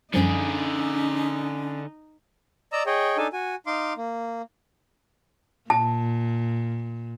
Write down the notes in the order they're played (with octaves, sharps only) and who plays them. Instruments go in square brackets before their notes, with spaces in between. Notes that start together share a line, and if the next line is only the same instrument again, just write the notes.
[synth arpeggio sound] F#2 F3 G3 [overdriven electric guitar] D3 G#4 [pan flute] C#4 [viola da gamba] D#4
[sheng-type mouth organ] D5 D#5 A#5 E6
G#4 C#5 D#5 G5
D4 D#4 A4 G#5
F#4 G#5
D#4 F5 C6 D6
A#3
[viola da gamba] A#2 [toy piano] A5